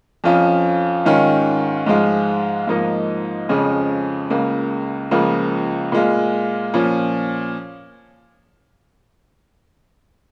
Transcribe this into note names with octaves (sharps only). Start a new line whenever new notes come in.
F2 F3 C#4 F4
G#2 D#3 C#4 F4
G#2 F3 G#3 F4
G#2 F3 A#3 D#4
F2 C#3 F3 G#3 C#4
C#2 C#3 A#3
C#2 C#3 F3 A#3
A#2 G#3 F4
A#2 F3 C#4